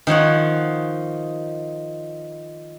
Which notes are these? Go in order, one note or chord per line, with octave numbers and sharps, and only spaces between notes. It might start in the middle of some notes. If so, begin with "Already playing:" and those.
D#3 F3 C#5 F#5